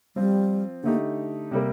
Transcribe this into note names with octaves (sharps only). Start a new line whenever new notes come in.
F3 G3 C4 F4
D3 A3 A#3 D#4 G4
C3 G3 A#3